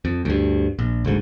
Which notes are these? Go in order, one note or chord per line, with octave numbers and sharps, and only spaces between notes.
F2
D2 G2
A#1
F#1 D2 G#2